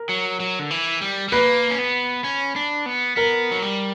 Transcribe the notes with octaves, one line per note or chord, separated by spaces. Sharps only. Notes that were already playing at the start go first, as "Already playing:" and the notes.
Already playing: A#4
F#3
F#3
D3
E3
G3
G3
A#3 B4
C#4
B3
C#4
D4
B3
B3 A#4
F#3
G3